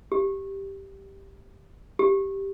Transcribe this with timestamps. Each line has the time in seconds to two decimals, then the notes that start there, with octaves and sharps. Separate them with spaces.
0.12 G4
1.99 G4